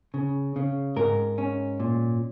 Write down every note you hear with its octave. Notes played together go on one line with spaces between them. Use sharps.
C#3
C#3
G#2 A#4
C#4
A#2